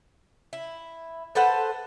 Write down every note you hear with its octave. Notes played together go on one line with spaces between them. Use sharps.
E4
A4 B4 C5 F#5